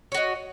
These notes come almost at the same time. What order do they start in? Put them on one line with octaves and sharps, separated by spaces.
C#5 F#4 D#5